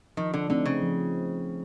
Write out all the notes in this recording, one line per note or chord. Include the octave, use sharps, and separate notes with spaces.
D#3 F3
D3
D3 A3 C4 D#4
C#3
F3